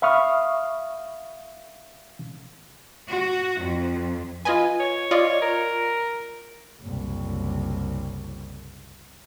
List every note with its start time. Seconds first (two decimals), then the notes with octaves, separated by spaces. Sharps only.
0.02 E5 F5 B5 C#6 D#6 F6
3.09 F#4
3.62 F2
4.45 F4 B4 D#5 G#5
4.80 C#5
5.11 F4 D5 D#5
5.42 A#4
6.81 F#1 C2